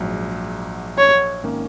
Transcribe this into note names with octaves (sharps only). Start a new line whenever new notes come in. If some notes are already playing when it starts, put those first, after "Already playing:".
Already playing: A#1 G#2 F#3
C#5
G#1 D#3 A#3 C#4